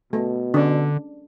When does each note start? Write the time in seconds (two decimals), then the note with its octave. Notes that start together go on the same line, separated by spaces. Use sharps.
0.13 B2 A3
0.54 D3 C#4 D4